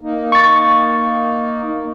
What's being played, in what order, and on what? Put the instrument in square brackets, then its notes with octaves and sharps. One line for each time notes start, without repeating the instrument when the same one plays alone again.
[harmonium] A#3 D#4
[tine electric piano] C#6 A6